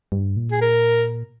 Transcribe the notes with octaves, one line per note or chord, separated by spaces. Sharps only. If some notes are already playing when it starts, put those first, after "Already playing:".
G2
A#2
G#4
A#4